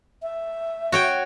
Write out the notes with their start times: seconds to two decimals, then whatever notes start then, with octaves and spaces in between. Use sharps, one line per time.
0.22 E5
0.92 F#4 C#5 G5